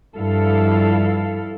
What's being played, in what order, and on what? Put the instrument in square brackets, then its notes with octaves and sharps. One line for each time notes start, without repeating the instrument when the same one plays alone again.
[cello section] G2 F3 E4 A4 F5